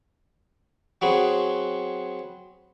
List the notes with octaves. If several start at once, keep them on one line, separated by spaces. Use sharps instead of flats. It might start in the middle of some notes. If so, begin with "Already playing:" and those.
F#3 B3 C4 F#4 G#4